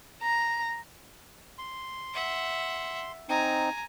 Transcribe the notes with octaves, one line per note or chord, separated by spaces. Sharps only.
A#5
C6
E5 F#5
C4 D#4 G#5 A#5